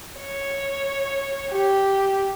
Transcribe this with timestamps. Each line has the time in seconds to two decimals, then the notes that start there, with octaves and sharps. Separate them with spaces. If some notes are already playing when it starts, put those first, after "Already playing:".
0.20 C#5
1.51 G4